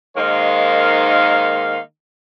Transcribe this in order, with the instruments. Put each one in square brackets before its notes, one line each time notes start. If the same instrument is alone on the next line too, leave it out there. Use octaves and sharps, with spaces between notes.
[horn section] D#3 G#3 A#3 D#4 C5 F5